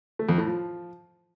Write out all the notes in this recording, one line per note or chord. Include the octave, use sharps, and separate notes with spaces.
A3
F2
A2
F3